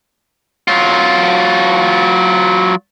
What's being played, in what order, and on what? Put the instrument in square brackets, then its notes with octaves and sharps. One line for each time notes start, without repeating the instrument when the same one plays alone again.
[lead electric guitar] F#3 F4